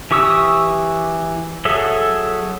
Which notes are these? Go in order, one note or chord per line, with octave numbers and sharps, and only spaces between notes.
E3 G4 C#6 D#6 E6
F#3 G#4 A4 E5